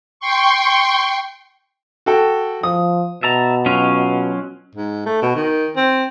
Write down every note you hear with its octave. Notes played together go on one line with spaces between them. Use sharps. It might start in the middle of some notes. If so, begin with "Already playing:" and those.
G5 C6 C#6
F#4 A4 G5
F3 D#6
B2 E5 A5 A#5
F#3 C#4 F4
G#2
A3
B2
D#3
C4